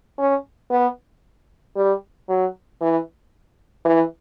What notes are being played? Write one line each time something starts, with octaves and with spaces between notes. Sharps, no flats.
C#4
B3
G3
F#3
E3
E3